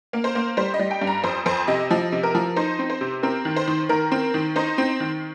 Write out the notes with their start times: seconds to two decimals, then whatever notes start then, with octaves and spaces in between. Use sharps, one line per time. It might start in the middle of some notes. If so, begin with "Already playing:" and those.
0.13 A#3
0.24 C5
0.35 A#3
0.57 G3 C5
0.74 D#5
0.79 G3
0.91 G5
1.01 G2
1.07 A#5
1.24 F2 C5
1.46 F2 C5
1.68 C3 D#5
1.90 F3 D#5
2.12 C3
2.23 A#4
2.35 F3
2.56 D#4 C5
2.79 C4
2.90 C5
3.01 C3
3.23 C4 A#4
3.45 D#3
3.56 C5
3.67 D#3
3.89 D#3 A#4
4.12 C4
4.34 D#3
4.56 D#4 C5
4.78 C4
5.00 D#3